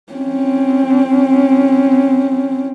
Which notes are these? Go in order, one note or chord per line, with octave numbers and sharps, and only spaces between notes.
C4 C#4